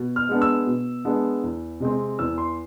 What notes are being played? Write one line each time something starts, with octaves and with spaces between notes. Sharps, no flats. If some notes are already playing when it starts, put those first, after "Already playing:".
Already playing: B2
F6
G#3 B3 D4
E6
B2
G#3 B3 D4
E2
C3 G#3 C4
E2 E6
C6